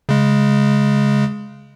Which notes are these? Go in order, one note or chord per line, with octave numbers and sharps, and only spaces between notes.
C#3 G#3